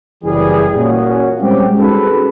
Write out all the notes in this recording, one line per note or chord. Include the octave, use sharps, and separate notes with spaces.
F#1 E3 G3 G#4
A#2 C#4 F#4
G3 G#3 C4 C#4 G4
C#4 D#4 F#4 G#4 A4 B4